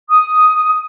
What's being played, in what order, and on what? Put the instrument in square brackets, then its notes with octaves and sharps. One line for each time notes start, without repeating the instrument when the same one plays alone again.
[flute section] D#6